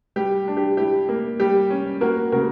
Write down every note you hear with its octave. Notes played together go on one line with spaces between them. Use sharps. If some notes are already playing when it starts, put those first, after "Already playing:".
G3 G4
D4
G4
E4 G4
A#3
G3 G4
C#4
A#3 F#4 A#4
C#3 F#4 A#4